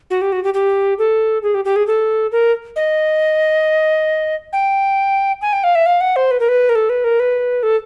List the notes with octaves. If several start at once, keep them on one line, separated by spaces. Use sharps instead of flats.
F#4
G4
F#4
G4
G4
A4
G#4
G4
G4
G#4
A4
A#4
D#5
G5
G#5
G5
F5
E5
F5
F#5
C5
B4
A#4
B4
A#4
A4
B4
A#4
B4
A4